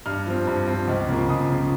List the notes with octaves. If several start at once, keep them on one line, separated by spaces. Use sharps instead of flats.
G2 F6
F3 C4
G2
F3 C4
C#2
C#3 F3 A#3
C#2 D#6
C#3 F3 A#3